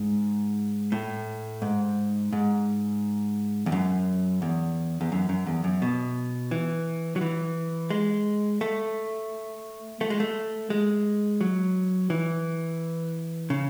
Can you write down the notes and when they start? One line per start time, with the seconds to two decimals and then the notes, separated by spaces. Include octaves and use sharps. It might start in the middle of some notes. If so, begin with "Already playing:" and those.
Already playing: G#2
0.92 A2
1.62 G#2
2.33 G#2
3.66 E2
3.72 F#2
4.42 E2
5.01 E2
5.12 F#2
5.29 F#2
5.46 E2
5.64 F#2
5.82 B2
6.51 E3
7.16 F#3
7.21 E3
7.90 G#3
8.61 A3
10.01 A3
10.10 G#3
10.20 A3
10.70 G#3
11.41 F#3
12.10 E3
13.50 C#3